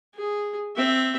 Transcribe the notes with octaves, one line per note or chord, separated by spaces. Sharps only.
G#4
C4 E5